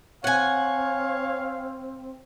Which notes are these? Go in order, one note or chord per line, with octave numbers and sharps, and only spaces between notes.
C4 C#5 F5 F#5 G#5